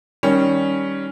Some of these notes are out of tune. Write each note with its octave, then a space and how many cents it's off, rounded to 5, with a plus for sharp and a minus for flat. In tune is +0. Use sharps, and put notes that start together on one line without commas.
D#3 +0 G3 +0 C#4 +0